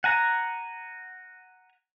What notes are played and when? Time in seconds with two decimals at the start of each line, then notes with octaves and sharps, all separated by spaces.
0.04 F#5 G#5 A#5